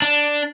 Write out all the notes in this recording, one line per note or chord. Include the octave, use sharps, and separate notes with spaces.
D4